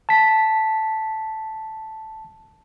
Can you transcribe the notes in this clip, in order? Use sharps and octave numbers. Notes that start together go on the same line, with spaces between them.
A5 B6